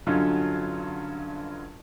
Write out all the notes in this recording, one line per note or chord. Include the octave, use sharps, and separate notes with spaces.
G2 D3 F#3 C#4 D#4 F4